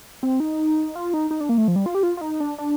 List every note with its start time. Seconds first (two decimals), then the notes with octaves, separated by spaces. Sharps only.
0.23 C4
0.40 D#4
0.95 F4
1.14 D#4
1.31 D#4
1.40 D4
1.49 A#3
1.58 A3
1.68 F3
1.76 G3
1.86 F4
1.95 G4
2.03 F4
2.17 F4
2.21 D#4
2.40 D4
2.58 D4